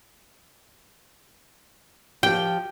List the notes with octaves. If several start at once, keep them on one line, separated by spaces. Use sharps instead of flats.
F3 G4 G5